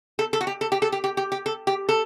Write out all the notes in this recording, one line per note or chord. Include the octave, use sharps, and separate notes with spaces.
A4
A4
F#4
G4
A4
G4
A4
G4
G4
G4
G4
A4
G4
A4